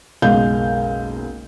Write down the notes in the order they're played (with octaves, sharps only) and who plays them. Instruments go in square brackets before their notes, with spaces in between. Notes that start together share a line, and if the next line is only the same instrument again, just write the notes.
[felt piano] F#1 B1 G#3 F5 G6